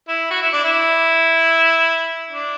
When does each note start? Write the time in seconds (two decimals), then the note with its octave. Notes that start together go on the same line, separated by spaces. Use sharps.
0.08 E4
0.31 F#4
0.42 E4
0.53 D4
0.64 E4
2.31 D4